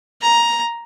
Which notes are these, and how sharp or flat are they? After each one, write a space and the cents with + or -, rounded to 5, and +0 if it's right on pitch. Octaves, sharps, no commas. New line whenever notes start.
A#5 +10